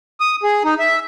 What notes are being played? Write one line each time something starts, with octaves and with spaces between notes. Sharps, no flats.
D#6
G#4
D#4
E5